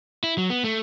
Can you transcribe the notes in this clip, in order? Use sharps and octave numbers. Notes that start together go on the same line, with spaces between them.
E4
F#3
B3
A3